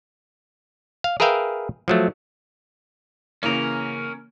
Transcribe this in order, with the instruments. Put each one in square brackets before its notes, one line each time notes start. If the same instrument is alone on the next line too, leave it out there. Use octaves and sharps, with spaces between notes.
[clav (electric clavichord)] F5
G#4 A#4 B4 E5 F5 G5
F3 F#3 A3
[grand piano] C#3 E3 A#3 [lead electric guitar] C#4 A#4